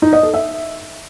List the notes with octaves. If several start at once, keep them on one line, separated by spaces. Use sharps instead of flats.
D#4
D#5
A4
E5